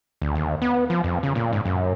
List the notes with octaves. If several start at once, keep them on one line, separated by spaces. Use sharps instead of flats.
D2
D#2
B3
F3
F2
C#3
A#2
G#2
F#2